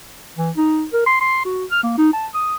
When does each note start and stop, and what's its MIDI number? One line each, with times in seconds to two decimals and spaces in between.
0.37 0.51 52
0.57 0.85 63
0.93 1.06 70
1.06 1.20 84
1.21 1.41 84
1.45 1.65 66
1.71 1.83 89
1.83 1.96 58
1.98 2.13 63
2.13 2.27 81
2.34 2.56 87